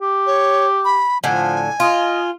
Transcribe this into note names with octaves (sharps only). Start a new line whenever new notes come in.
G4
C#5
B5
A2 D3 F3 G#5
F4 D#5